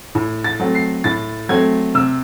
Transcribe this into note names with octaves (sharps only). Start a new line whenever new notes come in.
A2
A6
F#3 A3 C4
C7
A2 A6
F#3 A3 C4 G#6
C3 E6